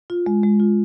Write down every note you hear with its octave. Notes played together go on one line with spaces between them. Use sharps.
F4
G#3
G#3
F4